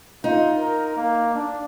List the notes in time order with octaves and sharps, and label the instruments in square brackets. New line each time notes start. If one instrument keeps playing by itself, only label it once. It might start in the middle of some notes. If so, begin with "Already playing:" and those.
[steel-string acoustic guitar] D#4 [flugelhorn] F4
[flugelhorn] A#4
A#3
D4